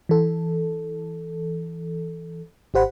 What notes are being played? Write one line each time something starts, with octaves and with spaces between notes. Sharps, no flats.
E3 A4
G#1 G4 C5 F#5 B5